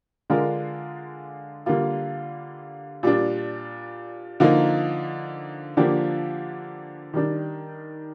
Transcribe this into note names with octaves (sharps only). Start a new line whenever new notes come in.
D3 G#3 D4 F4 A#4
D3 G3 A#3 F4
A#2 G3 D4
D3 F3 A#3 D#4
D3 F3 A#3 D4 G4
D#3 G3 D4